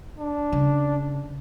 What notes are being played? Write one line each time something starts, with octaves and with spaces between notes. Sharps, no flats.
D4
C#3